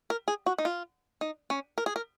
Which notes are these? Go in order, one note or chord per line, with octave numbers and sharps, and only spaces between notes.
A#4
G#4
F#4
D#4
F4
D#4
C#4
A#4
G#4
A#4